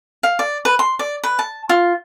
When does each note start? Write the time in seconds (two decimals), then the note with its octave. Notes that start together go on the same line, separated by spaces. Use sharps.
0.23 F5
0.39 D5
0.65 B4
0.79 C6
0.99 D5
1.24 B4
1.39 A5
1.69 F4